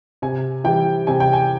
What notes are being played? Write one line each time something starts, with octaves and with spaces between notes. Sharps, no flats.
C3 G#5
E3 G3 G5
C3 G#5
G5
G#5